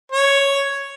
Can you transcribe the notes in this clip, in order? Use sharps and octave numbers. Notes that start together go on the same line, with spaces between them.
C#5